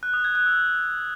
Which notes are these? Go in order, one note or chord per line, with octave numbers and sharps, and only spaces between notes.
F#6
D#6
G#6
F#6
E6